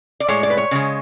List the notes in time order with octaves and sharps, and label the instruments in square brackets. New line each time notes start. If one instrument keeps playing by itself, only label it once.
[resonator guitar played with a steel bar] D5
A2 G#3 C#5
D5
B4
C#5
C#3 G#3